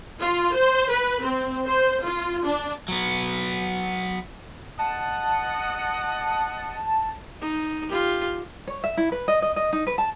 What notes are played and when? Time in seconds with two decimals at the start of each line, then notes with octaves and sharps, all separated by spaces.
0.20 F4
0.55 C5
0.90 B4
1.24 C4
1.67 C5
2.05 F4
2.44 D4
2.88 F#3 B3
4.79 D#5 F#5 A5
7.41 D#4
7.88 F4 G4
8.68 C#5
8.84 E5
8.97 E4
9.12 B4
9.28 D#5
9.42 D#5
9.56 D#5
9.73 D#4
9.87 B4
9.98 A5